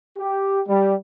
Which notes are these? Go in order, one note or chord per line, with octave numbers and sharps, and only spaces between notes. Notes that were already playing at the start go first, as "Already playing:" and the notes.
G4
G3